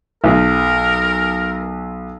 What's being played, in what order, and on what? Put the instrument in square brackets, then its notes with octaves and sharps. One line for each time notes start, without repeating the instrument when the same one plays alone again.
[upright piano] B1 [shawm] A#4